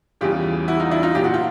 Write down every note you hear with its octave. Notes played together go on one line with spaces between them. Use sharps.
E2 C#3 E3 G3 F4 G4
E4 F#4
D#4 F4
D4 E4
D#4 F4
A#2 F#3 G4
F#4
F4